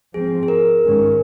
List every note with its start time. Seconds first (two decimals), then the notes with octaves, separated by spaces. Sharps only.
0.14 G#2 F3 C4 G#4
0.43 G#4
0.48 A#4
0.83 G#2 D#3 G#3 C#4